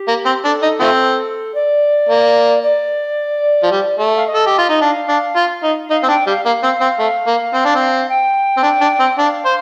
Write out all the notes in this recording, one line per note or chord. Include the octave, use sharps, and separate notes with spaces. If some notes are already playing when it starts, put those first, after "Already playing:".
Already playing: G4
A#3
C4
D4 A4
D#4
F3 A3 C4
D5
A#3
D5
F3
G3
A3
F5
D#5
A4
G4
F4
D#4
D4 F5
D4
F4
D#4
D#4 F5
C4
D4 G5
G3 F5
A#3 F5
C4
C4
A3
A#3
C4
D4
C4
G5
C4
D4
D4
C4
D4 F5
C5